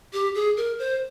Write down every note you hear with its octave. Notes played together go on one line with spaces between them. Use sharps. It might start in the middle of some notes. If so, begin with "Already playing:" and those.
G4
G#4
A#4
C5